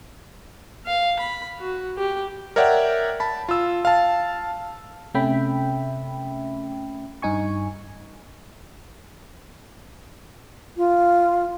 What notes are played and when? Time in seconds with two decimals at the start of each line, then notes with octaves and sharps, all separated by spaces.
0.86 F5
1.19 B5
1.60 F#4
1.97 G4
2.56 A#4 C#5 D5 E5 F#5 G5
3.20 A5 B5
3.49 F4 E6
3.85 F5 A5
5.14 C3 A3 C#4 E5 G5 B5
7.22 G2 D#4 G#5 C#6
10.77 F4